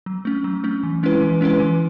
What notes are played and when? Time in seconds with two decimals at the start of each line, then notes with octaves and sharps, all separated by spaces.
0.06 F#3
0.25 A3 C#4
0.44 F#3
0.64 A3 C#4
0.83 E3
1.03 G#3 C#4 E4 B4
1.21 E3
1.41 G#3 C#4 E4 B4
1.60 E3